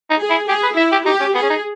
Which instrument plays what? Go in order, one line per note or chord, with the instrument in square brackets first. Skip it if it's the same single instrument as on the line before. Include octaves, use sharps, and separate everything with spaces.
[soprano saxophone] D#4
[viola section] G#4
[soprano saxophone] E4
[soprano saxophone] G4 [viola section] G#4
[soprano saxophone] B4
[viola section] E4 [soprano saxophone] E5
[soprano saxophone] G4
[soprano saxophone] D#4 [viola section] G4
[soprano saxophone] C#4
[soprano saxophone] B3 [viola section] G#4
[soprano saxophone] C#4
D#4